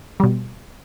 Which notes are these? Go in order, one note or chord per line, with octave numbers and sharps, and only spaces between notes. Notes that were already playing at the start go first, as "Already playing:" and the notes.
B2 G3